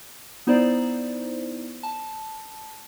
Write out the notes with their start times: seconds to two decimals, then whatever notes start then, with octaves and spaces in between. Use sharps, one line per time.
0.47 B3 D#4 E4 C5 D5
1.83 A5